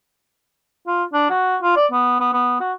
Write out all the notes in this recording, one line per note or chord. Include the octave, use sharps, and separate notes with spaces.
F4
D4
F#4
F4
D5
B3
B3
B3
F#4